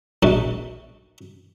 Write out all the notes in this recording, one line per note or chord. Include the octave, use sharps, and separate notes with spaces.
A#1 B2 A3